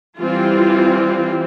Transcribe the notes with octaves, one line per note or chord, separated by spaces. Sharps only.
E3 G3 C4 F4